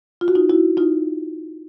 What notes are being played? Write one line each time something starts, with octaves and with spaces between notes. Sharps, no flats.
F4
F#4
D#4 F4
E4 F#4
D#4 F4